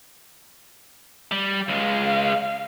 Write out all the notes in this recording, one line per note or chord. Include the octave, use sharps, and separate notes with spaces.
G3
C#2 G#3 F5